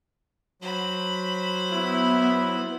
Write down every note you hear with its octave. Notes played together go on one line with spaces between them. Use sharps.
F#3 C5 B5
B3 E4